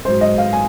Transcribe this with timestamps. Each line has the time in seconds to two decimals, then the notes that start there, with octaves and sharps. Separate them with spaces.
0.05 G#2 F#3 C5
0.21 D#5
0.38 F5
0.53 G#5